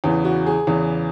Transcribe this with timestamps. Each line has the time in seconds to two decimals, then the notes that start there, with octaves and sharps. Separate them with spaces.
0.04 E2 C#3 E3
0.25 F#4
0.47 G#4
0.67 E2 C#3 E3